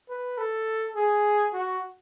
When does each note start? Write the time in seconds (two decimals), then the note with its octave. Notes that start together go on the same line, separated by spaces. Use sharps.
0.10 B4
0.38 A4
0.96 G#4
1.54 F#4